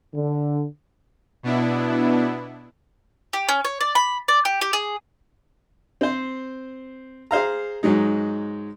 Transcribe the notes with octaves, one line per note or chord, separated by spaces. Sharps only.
D3
B2 B3 D4 E4
G4
C#4
C#5
D5
B5
D5
G4
G4
G#4
C4 C5
G#4 C5 F5 A#5
G#2 F#3 G#3 D#4